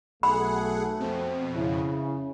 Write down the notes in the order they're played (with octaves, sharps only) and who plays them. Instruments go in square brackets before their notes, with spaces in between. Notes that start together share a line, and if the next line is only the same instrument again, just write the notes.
[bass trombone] B1 [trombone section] A3 [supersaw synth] G#4 F#5 [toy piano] B5
[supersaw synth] F2 B2 [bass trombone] C4
[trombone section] C#3 [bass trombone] E4